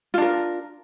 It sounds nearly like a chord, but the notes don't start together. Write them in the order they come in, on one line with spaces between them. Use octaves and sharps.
F4 D4 A#4